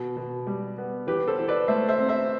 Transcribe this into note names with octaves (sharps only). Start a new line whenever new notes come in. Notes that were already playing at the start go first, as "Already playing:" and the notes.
Already playing: B2
B2
G3
B3
E3 G4 B4
A4 C5
E3
B4 D5
A3 C5 E5
C5 E5
C4
C5 E5